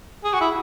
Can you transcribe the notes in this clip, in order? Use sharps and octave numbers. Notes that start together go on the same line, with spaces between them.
G#4
F#4
E4